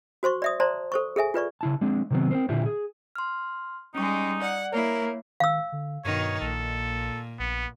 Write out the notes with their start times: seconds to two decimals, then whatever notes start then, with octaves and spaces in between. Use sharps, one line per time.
0.23 F#4 C5 C6 C#6
0.42 D5 E5 D#6
0.60 C5 D5 A5 A#5 C6
0.92 A4 C5 C#6
1.16 G#4 A4 E5 G#5
1.34 F4 B4 D5 C#6
1.61 C#3 E4 A5
1.81 G#3 C4 D4
2.11 C3 D#3 F#3 B3 C4
2.31 C4 A#4 C5
2.49 A#2 D3 E4 F4 G4
2.66 G#4
3.16 C6 F6
3.95 G3 G#3 C#4 D#4 C#6
4.42 D5 F#5
4.73 A#3 E4 A#4 C#5
5.40 D#3 F5 E6
5.72 D3
6.05 G2 B2 D#3 D#4 C#5
6.41 A#1 A#2 A4
7.39 A#1 B3